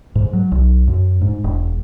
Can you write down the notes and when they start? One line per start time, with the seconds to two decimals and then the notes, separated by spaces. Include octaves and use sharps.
0.15 G#2
0.33 F#3
0.52 B1
0.87 F#2
1.21 G#2
1.44 E1